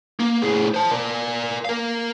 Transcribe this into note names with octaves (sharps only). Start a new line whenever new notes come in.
A#3
A2 G#4
C5 A5
A#4 D5
A#4 F5